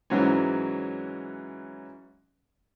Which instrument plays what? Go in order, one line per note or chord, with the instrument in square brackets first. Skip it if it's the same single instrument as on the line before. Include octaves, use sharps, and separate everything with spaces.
[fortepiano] G#2 E3 F#3 C4 C#4